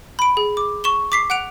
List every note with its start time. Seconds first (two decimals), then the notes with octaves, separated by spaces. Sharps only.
0.19 B5 D7
0.37 G#4
0.57 D6
0.84 C#6 E7 G7
1.12 D6 B6 C7
1.30 F#5 F#6 D7 F7